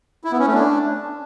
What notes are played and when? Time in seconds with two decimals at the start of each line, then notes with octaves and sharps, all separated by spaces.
0.24 E4
0.32 B3
0.39 C#4
0.47 A3
0.54 D4